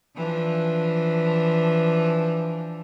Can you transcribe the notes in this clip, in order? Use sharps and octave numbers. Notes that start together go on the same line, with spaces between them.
E3 F3 D4